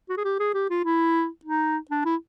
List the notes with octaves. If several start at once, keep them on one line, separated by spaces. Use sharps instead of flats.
F#4
G#4
G4
G#4
G4
F4
E4
D#4
D4
E4